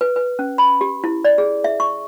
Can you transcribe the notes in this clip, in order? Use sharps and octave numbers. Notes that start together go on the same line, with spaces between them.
B4
B4
C#4
B5
G4
E4
D5
G#4
E5
C#6